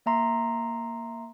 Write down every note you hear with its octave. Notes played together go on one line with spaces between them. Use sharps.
A#3 E5 A#5 C6 C7